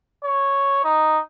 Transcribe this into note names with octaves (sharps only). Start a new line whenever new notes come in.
C#5
D#4